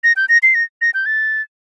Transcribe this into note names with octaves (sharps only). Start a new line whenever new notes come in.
A#6
G6
A#6
C7
A#6
A#6
G6
A6